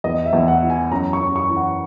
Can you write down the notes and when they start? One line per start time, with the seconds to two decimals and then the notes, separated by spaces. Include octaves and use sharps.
0.04 E2 D#5
0.26 E5
0.33 E2
0.48 F#5
0.63 E3
0.70 G#5
0.91 F#2 A#5
1.13 C#6
1.21 F#2
1.36 C#6
1.50 E3
1.56 F#5